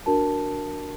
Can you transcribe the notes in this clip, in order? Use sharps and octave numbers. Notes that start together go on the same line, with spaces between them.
D4 F#4 A#4 A5